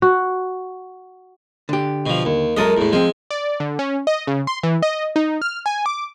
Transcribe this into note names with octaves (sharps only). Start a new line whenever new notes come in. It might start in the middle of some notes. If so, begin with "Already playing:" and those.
F#4
D3 G4
B2 F3
D#2
F#2 G#3 A4 A#4 D#5
E2 A2
F3 G#3 C4
D5
D3
C#4
D#5
C#3
C6
E3
D#5
D#4
F6
G#5
D6